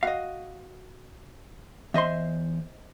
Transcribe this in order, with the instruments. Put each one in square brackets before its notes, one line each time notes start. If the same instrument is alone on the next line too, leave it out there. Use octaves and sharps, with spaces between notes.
[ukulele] F#4 D#5 [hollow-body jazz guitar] F5
[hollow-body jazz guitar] E2 C6 [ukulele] C5 D#5 E5